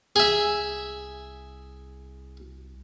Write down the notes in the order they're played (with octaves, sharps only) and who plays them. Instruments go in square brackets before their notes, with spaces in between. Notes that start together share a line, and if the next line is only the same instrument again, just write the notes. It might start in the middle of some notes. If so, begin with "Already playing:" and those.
[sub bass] C2 [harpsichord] G#4 E5